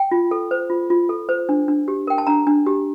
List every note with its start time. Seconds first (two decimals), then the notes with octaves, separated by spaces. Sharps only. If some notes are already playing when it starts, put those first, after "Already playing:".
Already playing: G5
0.11 F4
0.31 A4
0.51 C5
0.70 F4
0.90 F4
1.09 A4
1.29 C5
1.49 D4
1.68 D4
1.88 G4
2.07 A#4 G5
2.18 A5
2.27 D4 A#5
2.47 D4
2.66 G4